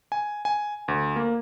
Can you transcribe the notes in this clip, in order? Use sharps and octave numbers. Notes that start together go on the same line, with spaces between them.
G#5
G#5
D2
A#3